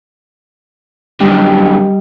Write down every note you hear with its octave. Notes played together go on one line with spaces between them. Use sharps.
F#2 D3 G3 D#4